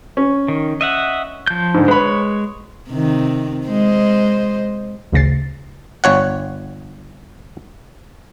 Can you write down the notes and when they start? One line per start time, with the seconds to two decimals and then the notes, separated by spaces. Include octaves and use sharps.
0.17 C#4
0.48 D#3
0.81 D#5 E5 F#5
1.47 F3 G6
1.74 G#2 D3
1.88 G#3 B4 C#5 B5
2.89 C3 D#3
3.66 G#3 C5 D#5
5.12 A1 D2 C#3 A6 C7
6.04 G1 C#5 F#5